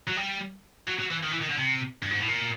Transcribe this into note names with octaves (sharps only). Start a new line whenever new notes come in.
F#3
G3
F#3
F#3
E3
D#3
E3
D#3
D3
C3
G2
G#2
A2
A#2